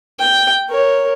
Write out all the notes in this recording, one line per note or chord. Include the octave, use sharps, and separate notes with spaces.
G5
A#4 C#5